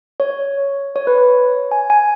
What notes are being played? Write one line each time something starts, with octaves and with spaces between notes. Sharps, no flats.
C#5
C#5
B4
C#5
G#5
G#5